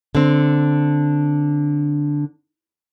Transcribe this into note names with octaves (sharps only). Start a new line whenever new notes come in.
D3 C4